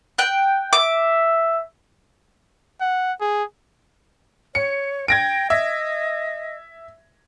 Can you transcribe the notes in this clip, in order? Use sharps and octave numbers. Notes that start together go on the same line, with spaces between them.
G5 F#6
E5 D6
F#5
G#4
C#5 C#7
G5 G#6 A#6 D7
D#5 E5